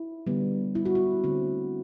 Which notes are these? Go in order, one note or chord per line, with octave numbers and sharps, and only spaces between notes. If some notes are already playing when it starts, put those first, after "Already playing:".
Already playing: E4
D3 G3 B3
E4
F#4
E4
D3 A3 C4